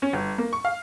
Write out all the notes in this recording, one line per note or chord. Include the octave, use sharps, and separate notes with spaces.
C#4
G1
A#3
C#6
F5